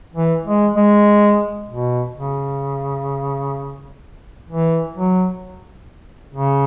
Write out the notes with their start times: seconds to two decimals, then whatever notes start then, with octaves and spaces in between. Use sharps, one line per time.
0.15 E3
0.45 G#3
0.76 G#3
1.70 B2
2.16 C#3
4.49 E3
4.95 F#3
6.35 C#3